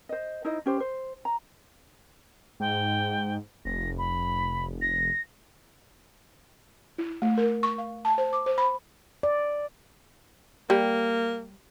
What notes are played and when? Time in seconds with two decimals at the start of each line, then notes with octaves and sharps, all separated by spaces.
0.09 C5 D#5
0.45 D#4 E4 C5 D#5
0.66 C#4 G4 C5
0.80 C5
1.25 A#5
2.60 G#2 G5
3.65 F1 A#6
3.98 B5
4.81 A#6
6.98 E4
7.22 A3
7.38 A#4
7.63 C#6
7.78 F5
8.05 A5
8.18 C5
8.33 D6
8.46 C5
8.58 B5
9.23 D5
10.70 G3 A#3